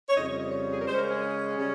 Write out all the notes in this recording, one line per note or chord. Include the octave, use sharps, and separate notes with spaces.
C#5
F2 C#3 G3 D#5
C#5
D#5
C#5
G#4
A#4
C#3 G#3 C#4 C5
A#4
G#4
C#3 G3 C#4